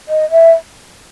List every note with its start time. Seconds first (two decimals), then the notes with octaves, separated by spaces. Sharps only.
0.08 D#5
0.31 E5